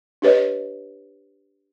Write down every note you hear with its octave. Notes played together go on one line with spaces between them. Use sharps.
D4 G4 B4 C#5 D#5